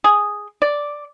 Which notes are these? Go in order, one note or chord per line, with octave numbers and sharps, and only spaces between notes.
G#4
D5